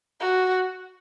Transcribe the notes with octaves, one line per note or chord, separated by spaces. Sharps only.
F#4